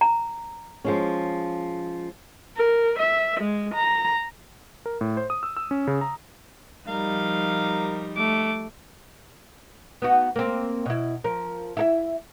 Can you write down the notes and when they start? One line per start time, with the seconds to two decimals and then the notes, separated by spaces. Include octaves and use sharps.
0.01 A#5
0.85 F3 G#3 C#4
2.56 A#4
2.99 E5
3.40 G#3
3.74 A#5
4.86 A#4
5.01 A2
5.17 C5
5.30 D#6
5.43 E6
5.57 E6
5.71 C#4
5.87 C#3
6.01 A#5
6.88 F3 G3 D#4 A#4 F5
8.17 A3 D6
10.02 B3 D#4 F#4
10.36 A#3 C4
10.86 B2 E4
11.24 F3 A#4
11.77 E4 A4 E5